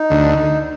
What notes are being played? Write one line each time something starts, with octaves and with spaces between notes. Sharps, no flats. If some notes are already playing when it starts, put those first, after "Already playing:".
Already playing: D#4
D2